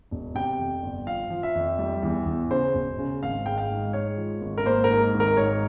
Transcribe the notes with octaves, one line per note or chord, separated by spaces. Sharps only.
E1
C3 G5
F2
G1
F3 F5
F3
E5
F2
G3
E2
E2
C#3 C5
E1
C#3
G#1 F5
G#3 G5
F5
G#2
G#3 C#5
F3
G#1
A#4
A#3 C5
A#4
G#2
G#1
A#4
G#2 C#5